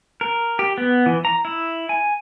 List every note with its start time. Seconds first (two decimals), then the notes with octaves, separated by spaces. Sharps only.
0.21 A#4
0.59 G4
0.78 B3
1.06 E3
1.25 A#5
1.45 E4
1.89 G#5